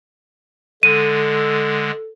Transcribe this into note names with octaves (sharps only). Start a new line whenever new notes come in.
D3 G#3 A4 D#7